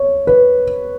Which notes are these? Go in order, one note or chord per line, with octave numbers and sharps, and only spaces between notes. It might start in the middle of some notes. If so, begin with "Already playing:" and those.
Already playing: C#5
B4